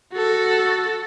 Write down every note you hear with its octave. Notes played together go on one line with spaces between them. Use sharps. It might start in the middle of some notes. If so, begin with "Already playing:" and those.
F#4 A4